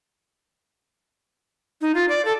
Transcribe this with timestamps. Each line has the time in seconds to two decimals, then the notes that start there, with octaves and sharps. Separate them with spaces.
1.81 D#4
1.95 F4
2.09 D5
2.25 A4